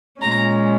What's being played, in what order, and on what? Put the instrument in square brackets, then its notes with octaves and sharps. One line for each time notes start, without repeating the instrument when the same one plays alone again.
[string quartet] A#2 G#3 C#4 A#5